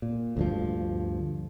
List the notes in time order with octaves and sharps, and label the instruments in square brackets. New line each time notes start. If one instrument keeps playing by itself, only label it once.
[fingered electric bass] A#2
D2 G2 F3